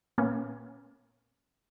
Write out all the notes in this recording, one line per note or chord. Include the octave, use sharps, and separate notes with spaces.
A#2 A#3 B3 C#4